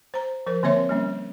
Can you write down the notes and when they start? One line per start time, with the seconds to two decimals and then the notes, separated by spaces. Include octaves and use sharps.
0.14 C5 A#5
0.46 F3 A#4 C5
0.63 D3 A#3 C4 C#5 E5 C6
0.89 G3 A#3 C#4